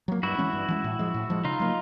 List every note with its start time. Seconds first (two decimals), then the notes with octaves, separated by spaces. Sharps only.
0.08 F#3 A#3
0.23 G2 E4 F#4
0.38 E3 G#3 C#4
0.53 G2
0.68 E3 G#3 C#4
0.84 A2
0.99 F3 G#3
1.14 A2
1.30 F3 G#3
1.44 C#3 D#4 F4
1.60 F#3 A#3